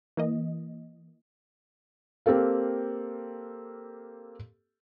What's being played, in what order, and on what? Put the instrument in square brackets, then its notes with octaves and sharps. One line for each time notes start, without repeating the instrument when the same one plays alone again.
[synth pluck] E3 A#3 D#5
[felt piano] A#3 C4 G4 A4 F5